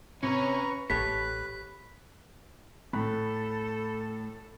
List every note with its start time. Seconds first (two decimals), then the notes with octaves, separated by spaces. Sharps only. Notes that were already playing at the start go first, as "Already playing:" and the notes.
0.23 C3 C#4 B4 C#5 A#5 C#6
0.90 A1 G4 A4 B4 C#5 B6
2.93 A2 A4 B5 F#6